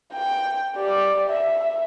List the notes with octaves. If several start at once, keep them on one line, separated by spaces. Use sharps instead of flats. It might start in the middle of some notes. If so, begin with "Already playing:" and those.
G5
G4 D5
E5